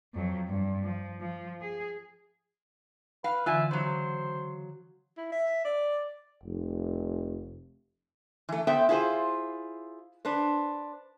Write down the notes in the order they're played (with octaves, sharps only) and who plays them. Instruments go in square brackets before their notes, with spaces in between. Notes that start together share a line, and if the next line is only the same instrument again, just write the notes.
[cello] F2 F#3
G2
F3
F3
G#4
[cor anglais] B4 [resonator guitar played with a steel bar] F5
[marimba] D3 E3 [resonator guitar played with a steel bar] F4 G#5 [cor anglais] E5
[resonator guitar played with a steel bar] C#3 F#3 [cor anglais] C5
[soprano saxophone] E4
E5
D5
[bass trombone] F1
[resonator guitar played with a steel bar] E3 A3
B3 A4 C5 E5 G5
E4 F4 G#4 B4 C5
D4 B4 C5